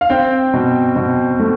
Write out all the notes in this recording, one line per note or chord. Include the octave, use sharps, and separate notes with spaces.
F5
C4 G5
B2
B2
A3